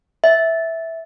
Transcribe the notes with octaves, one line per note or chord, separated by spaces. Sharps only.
E5